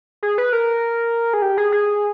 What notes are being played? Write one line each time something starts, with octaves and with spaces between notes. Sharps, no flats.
G#4
B4
A#4
G#4
G4
G#4
G#4